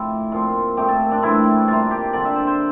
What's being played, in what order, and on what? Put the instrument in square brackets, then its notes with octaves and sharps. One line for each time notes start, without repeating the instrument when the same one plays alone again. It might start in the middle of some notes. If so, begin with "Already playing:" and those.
Already playing: [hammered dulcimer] A2 F3 A3 C4 E4 G4 C5 D5
A#2 F3 C4 F4
A#2 A3 C4 G4
A4
D4
A2 E3 G3 C4 E4
C3 G3 A#3 F4
G4
D3 G3 C4 D5
E5
C5
C5